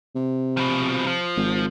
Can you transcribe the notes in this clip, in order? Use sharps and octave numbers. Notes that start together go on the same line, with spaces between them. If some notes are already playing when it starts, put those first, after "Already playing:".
C3
B2 F3
F3
G#1